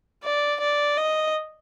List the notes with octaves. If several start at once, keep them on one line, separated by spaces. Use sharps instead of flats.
D5
D5
D#5